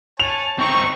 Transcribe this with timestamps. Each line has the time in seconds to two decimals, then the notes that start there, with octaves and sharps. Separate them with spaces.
0.20 C#5 G#5 A5 F7
0.59 C4 D#4 C#6